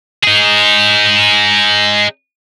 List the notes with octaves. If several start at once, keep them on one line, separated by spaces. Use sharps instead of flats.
D#4 G#4